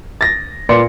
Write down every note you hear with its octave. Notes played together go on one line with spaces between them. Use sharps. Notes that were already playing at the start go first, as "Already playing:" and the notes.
A6 A#6
A#2 B4 D5 C6 C#7